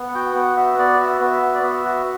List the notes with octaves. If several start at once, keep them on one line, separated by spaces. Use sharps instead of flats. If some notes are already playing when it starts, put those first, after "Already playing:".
Already playing: B3
F#5
F#4 G5
B3 F#5
F#4 E5
B3 D5
F#4 E5
B3 E5
F#4
D5
B3 E5
F#4